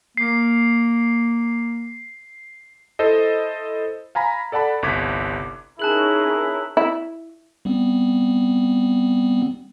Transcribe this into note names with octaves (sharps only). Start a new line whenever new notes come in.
A#3 C7
E4 A4 C5 D#5
F5 G#5 A#5 B5
A4 D5 F#5 A5 B5
G1 C2 D6 G#6 B6
C#4 D#4 E4 G#4 A#4 A5 F#6 F#7
E4
G3 B3 C4